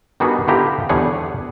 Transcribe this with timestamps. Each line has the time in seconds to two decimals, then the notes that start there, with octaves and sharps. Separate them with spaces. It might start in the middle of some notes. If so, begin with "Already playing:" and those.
0.20 D#3 G3 B3 D4 F#4 G#4
0.48 D3 B3 E4 F4 G4 A#5
0.89 E2 D3 G3 G#4 C#5 F#5